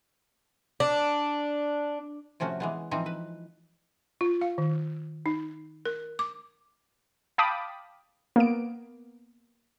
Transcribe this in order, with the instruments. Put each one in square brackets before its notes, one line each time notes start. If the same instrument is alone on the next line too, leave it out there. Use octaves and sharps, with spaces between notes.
[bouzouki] D4
[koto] C3 F3 A3 C#4 F#4
E3 G#3 B3
E3 F3 C4 D#4
B4
[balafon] F4
F5
D#3
D#4
A#4
D6
[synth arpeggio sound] F5 G5 A5 B5 D6 D#6
A#3 B3 D7